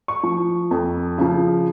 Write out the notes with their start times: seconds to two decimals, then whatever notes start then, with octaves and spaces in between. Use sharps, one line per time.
0.08 C#6
0.23 F3
0.71 F2
1.18 C#3 F3